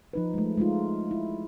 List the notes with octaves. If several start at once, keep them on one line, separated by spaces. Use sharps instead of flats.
F3 D#4 B4
G#3 A3
G#3 A3 D#4 F4
E4